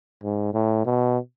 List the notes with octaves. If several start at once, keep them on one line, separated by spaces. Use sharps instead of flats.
G#2
A2
B2